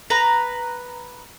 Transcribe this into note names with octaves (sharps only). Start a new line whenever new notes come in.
B4 A#5